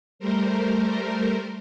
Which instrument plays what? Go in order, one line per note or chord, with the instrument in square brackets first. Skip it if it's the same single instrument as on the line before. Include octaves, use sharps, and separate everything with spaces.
[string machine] G3 A3 A#4 C5